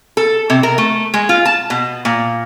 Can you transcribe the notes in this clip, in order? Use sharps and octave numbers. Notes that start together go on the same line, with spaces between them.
A4
C3
A#4
A3
G#3
F4
A5
B2
A#2